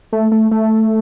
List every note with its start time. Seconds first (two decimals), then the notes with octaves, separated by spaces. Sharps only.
0.13 A3
0.32 A3
0.51 A3